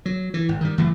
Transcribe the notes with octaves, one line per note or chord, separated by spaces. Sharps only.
F#3
E3
G#1
D#3 G3
F#1 E3 F#3 A3